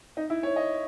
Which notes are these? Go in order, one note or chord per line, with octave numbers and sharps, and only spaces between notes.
D#4
E4
C#5
D#5